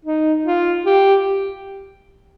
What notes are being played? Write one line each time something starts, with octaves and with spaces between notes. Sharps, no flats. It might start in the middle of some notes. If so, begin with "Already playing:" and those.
D#4
F4
G4